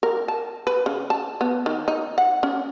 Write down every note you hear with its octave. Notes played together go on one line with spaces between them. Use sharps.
A#4
A5
B4
C#3
A5
B3
D#3
D#4
F#5
C#4